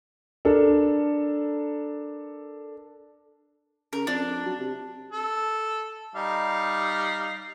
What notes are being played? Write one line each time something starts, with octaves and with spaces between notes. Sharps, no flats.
D4 A4 A#4
C#3 A#4
F2 D4
F#3
C3
A4
G3 D#4 F5